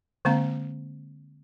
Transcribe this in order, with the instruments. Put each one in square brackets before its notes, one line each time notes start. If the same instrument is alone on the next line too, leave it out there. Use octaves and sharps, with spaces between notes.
[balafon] D3 G#3 A#3 C4 F5 A#5